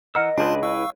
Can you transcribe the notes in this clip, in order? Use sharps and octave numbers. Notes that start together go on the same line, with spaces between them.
E3 A#4 D#5 F#5 E6
C#2 D4 F4 G#4 B4 A5 C6
E4 B4 F5 C#6 E6